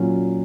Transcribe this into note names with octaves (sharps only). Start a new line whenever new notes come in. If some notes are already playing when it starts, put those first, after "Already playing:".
Already playing: A#2 F#3 C#4